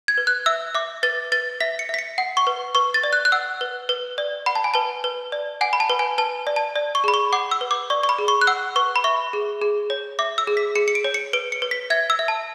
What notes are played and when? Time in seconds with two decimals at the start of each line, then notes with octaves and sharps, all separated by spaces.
0.08 G#6
0.18 B4
0.27 F#6
0.46 E5 E6
0.75 E5 D6
1.03 B4 A6
1.32 B4 A6
1.60 E5 B6
1.79 C#7
1.89 E5 B6
1.99 C#7
2.18 F#5
2.37 C#6
2.47 B4
2.75 B4 C#6
2.94 A6
3.04 D5
3.13 F#6
3.25 F#6
3.32 F#5 E6
3.61 B4
3.89 B4
4.18 D5
4.46 F#5 B5
4.55 A5
4.64 G#5
4.74 B4 A5
5.04 B4
5.32 D5
5.61 F#5 G#5
5.73 B5
5.80 A5
5.90 B4
5.99 G#5
6.18 B4 A5
6.47 D5
6.56 A5
6.76 D5
6.95 C#6
7.04 G#4 B5
7.14 C#6
7.33 F#5 D6
7.51 E6
7.61 B4
7.71 D6
7.90 D5 C#6
8.03 C#6
8.09 B5
8.19 G#4
8.28 C#6
8.41 F#6
8.47 F#5 E6
8.76 B4 C#6
8.96 B5
9.04 E5 C#6
9.33 G#4
9.62 G#4
9.90 C#5
10.19 E5 D6
10.38 E6
10.47 G#4
10.57 B6
10.75 G#4 C#7
10.88 C#7
10.95 D7
11.04 C#5
11.14 C#7
11.33 B4 D7
11.52 C#7
11.62 B4
11.71 B6
11.90 E5 G#6
12.10 E6
12.19 E5
12.28 A5